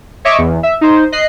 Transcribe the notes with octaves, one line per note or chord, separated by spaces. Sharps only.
C#5 D#5 E5 C#6 D6
E2
E5
D#4 C5
D#5 F#6 C7